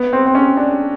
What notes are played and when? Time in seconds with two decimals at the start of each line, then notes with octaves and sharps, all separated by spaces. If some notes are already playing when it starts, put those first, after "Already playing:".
Already playing: B3
0.13 C4
0.26 C4
0.35 C#4
0.57 D4